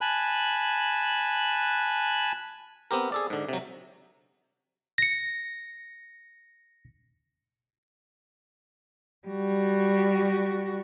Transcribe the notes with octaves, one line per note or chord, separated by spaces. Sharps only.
G#5 A5 B5 F#6
B3 C4 G4 A#4
G#4 A4 D5
G#2 D3
C3 F#3
A#6 C#7
G3 F#4